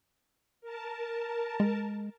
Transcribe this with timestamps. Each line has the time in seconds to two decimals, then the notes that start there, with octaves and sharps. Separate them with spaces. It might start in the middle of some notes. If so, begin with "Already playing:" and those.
0.61 A#4 A5
1.60 G#3